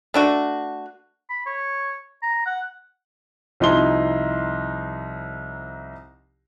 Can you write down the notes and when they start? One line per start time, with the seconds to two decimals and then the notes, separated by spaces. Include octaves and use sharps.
0.14 A3 D4 F#4
1.30 B5
1.46 C#5
2.23 A#5
2.46 F#5
3.60 C2 F3 D#4 E4 C6 G7